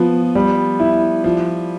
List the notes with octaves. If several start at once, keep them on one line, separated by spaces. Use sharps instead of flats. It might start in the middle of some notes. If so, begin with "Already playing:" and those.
Already playing: F3 B3
G3
E4
F3